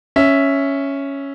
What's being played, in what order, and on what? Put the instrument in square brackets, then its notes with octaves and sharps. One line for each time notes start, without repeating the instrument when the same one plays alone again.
[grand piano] C#4 E5